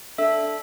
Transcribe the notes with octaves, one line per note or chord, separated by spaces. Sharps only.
D4 A4 E5 E6